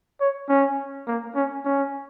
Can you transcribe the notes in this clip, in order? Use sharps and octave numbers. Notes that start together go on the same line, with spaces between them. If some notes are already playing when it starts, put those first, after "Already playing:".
C#5
C#4
A#3
C#4
C#4